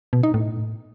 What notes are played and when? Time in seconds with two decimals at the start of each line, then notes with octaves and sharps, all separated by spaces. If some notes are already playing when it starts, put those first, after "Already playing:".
0.13 B2
0.23 D#4
0.34 A2